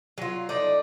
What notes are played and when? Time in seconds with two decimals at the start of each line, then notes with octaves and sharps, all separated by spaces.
0.18 F#3 F4
0.49 A3 D#4 D5